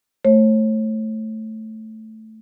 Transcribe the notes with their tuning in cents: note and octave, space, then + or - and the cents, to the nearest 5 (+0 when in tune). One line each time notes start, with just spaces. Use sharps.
A3 +0 C#5 -40